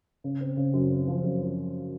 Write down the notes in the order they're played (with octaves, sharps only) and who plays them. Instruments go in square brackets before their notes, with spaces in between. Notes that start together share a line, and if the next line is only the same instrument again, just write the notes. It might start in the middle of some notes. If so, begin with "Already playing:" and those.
[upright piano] C#3
C4
C#3
F#2
C4
F3
F#2
F3